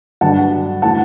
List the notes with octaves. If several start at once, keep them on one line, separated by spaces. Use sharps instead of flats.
G2 D3 F#3 F#5 A5
E3 A3 F#5 A5